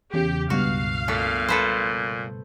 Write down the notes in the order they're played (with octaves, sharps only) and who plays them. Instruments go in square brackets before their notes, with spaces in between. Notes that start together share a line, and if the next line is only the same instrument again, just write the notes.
[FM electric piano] E2 C#3 [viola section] G4
[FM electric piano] C#2 G2 B2 [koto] F#4 [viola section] F5
[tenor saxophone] A#2 [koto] A3
[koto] A4 B4 C5